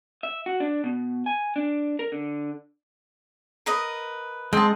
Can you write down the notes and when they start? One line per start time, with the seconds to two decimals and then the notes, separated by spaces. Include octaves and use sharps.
0.23 E5
0.46 F#4
0.60 D4
0.84 B2
1.26 G#5
1.56 D4
1.99 A#4
2.12 D3
3.66 A#4 B4 D#5
4.53 G#3 C4 D#5 A5